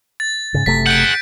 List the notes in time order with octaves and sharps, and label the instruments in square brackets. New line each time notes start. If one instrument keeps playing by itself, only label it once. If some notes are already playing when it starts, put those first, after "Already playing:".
[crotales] A6
[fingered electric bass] G#2 C#3
[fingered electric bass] F#1 C3 A3 [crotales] B6
[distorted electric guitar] G#4 F#5 [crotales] G6 D7